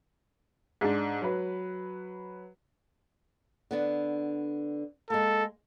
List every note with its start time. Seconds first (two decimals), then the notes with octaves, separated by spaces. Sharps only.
0.81 G#2 G#3 D4
1.22 F#3 B4
3.71 D3 B3 D4
5.10 G#3 A#3 A4